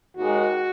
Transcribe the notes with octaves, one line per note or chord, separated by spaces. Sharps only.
D#2 D#3 G#3 F#4